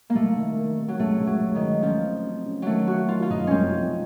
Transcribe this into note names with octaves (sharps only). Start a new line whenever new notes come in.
A#3
C2 A3
D#3
D#3
C3
F#3
C#2 A3
C#2
F#3
C#2
D#3
C#2
C#3 F3
C4
C4
C#3
D#3 F#3 A3
A#3 F#4
D#3 F4
F4
F#1 D#4
C2 C4 C#4
F3